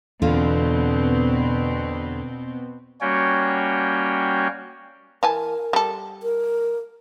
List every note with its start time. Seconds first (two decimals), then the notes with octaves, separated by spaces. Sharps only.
0.22 E2 B2 D3 B3 C4 F4
3.01 G3 A#3 C#4 F#4 C#5 G5
5.23 E3 A#4 G#5 A5
5.73 G3 A4
6.23 A#4